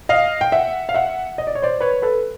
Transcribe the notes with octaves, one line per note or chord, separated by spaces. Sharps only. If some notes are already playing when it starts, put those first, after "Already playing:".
D#5 F5
G5
E5 F#5
F5
E5 F#5
D#5
D5
C#5
C5 D5
B4 C#5
A4 B4